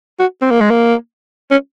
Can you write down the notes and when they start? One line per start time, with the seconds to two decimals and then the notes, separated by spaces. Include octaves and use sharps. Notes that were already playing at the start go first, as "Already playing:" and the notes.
0.19 F#4
0.42 C4
0.51 A#3
0.61 G#3
0.70 A#3
1.51 C#4